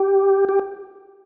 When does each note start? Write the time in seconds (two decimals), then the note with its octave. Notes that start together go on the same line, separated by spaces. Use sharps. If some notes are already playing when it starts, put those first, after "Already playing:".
Already playing: G4
0.49 G4